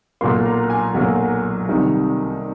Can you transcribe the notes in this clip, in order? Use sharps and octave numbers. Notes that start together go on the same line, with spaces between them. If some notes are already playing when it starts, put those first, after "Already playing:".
B1 A#2 F#3 A#3 C6
A#5
G#5
B1 A#2 F#3 A#3
C2 C3 D#3 G3